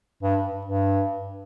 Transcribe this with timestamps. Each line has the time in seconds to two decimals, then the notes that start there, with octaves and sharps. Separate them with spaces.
0.23 G2
0.65 G2